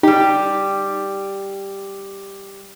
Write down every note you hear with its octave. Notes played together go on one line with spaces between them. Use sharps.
G3 D#4 G4